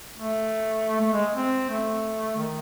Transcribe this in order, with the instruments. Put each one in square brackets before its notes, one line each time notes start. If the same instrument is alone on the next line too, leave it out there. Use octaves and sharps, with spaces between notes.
[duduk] A3
A3
G#3
C4
A3
D#3